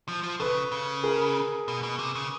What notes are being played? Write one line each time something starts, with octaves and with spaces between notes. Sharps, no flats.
F3
F3
C#3 A4 B4
C#3
G#4 A#4
B2
B2
C3
C#3